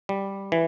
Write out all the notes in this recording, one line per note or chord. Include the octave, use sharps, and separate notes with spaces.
G3
E3